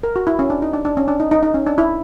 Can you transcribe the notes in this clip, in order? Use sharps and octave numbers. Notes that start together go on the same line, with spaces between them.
A#4
F#4
E4
C#4
D4
D#4
D4
D4
C#4
D4
D#4
D#4
D#4
C#4
D4
E4